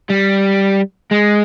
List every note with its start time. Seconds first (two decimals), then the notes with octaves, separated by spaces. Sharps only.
0.10 G3
1.11 G#3